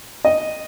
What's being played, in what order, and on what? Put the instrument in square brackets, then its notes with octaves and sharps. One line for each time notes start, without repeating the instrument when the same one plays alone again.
[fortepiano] D#5